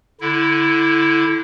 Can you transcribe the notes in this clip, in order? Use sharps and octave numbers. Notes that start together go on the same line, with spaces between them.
D3 E4